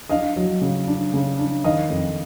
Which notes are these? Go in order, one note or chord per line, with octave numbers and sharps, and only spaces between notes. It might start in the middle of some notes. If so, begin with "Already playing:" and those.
D4 D#5 F5
F#3
C#3
D4
C#3
D4
D#3 D#5 F5
F2